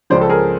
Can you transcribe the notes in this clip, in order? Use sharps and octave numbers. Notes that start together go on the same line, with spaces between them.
C#2 C#3 F3 C5 D5
A4
G#4 A#4